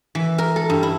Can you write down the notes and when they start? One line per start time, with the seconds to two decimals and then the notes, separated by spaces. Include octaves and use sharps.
0.15 E3
0.38 A#4
0.56 A4
0.70 G2
0.83 E4